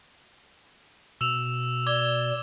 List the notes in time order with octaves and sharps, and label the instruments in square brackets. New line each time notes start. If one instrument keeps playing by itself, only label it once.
[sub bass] B2 [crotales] E6 E7 F7
[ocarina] D5 [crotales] D6 G#6 G7